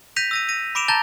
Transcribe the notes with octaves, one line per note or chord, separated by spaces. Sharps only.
G6 A#6 B6 D#7 F7
E6 A#6 D#7
A#6 D#7
B5 D6 D7 E7 F7
A5 A#5 G6 A6 A#6 G7